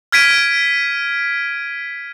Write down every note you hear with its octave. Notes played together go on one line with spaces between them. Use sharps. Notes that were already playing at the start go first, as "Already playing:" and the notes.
F6 G#6 B6 D7 D#7